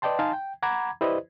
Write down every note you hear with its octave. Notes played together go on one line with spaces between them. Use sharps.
B4 D5 D#5 G5 A5 C6
D#4 F5 G#5 A5 C6
G5
F#5 A#5 B5 D6 G#6
E4 G4 B4 C5 D5 D#5